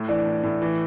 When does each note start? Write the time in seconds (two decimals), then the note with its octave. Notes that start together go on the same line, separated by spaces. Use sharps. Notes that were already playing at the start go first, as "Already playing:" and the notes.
Already playing: A2
0.08 E3 D4 D5
0.26 A2
0.43 A2
0.62 E3